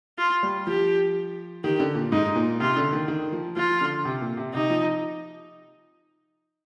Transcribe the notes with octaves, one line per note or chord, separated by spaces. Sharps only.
F4
G3
F3 G4
D#3 G4
D3
A#2
G#2 D#4
A#2
C3 F4
D3
D#3
D#3
F3
F3 F4
D3
C3
A#2
C3
C3 D#4
F3